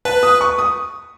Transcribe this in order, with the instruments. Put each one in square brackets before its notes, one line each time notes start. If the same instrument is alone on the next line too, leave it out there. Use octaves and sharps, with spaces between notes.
[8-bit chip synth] B4 [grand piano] A5
[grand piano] D#6
C#6
D#6